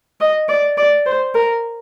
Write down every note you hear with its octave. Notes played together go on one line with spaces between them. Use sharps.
D#5
D5
D5
C5
A#4